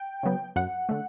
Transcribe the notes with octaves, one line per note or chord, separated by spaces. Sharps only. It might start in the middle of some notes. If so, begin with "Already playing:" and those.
Already playing: G5
C#3 F#3 B3
F#2 F#5
D3 A3